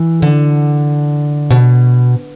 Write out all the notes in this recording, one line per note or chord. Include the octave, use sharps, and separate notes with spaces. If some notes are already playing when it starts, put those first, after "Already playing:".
Already playing: E3
D3
B2